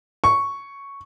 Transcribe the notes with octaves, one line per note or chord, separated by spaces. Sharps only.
C#6